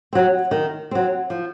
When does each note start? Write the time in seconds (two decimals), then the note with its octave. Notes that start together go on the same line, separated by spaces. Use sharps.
0.13 F#3 C4
0.51 D#3
0.91 F#3 C4
1.30 F3